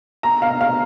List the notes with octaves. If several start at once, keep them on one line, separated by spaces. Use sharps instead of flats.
A#5
F5
F5